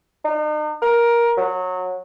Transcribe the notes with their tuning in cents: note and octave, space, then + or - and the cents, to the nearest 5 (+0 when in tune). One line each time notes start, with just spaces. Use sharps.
D#4 -45
A#4 +15
F#3 -20